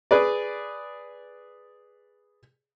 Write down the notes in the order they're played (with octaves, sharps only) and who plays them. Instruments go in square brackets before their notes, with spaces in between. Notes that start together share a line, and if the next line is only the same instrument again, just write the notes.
[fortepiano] G#4 B4 D5